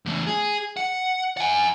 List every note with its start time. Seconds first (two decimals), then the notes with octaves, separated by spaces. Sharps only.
0.06 E2 A3
0.27 G#4
0.77 F#5
1.37 F#5 G#5